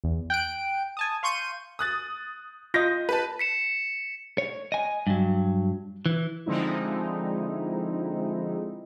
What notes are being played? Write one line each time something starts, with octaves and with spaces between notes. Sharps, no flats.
E2
G5 F#6 D7
G#5 A5 D#6
F5 C6 C#6 G6 D#7
D#6 F#6 A6
F4 D#5 G6 A#6
B4 A5
B6 C#7 E7
C#5
D#5 G#5
G2 F#3
E3
D3 F3 G#3 C4 D#4 E4